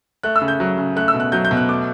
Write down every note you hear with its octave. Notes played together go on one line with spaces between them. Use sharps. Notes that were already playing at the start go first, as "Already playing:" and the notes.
A3 F#6
E6
C#3
G6
F#3
C#3
A3 F#6
E6
B2
F#6
F#3 G6
G6
B2
F#6
A3 D6